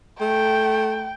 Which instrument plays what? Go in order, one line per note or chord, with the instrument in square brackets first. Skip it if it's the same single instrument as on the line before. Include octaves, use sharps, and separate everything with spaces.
[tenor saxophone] A3 [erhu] G5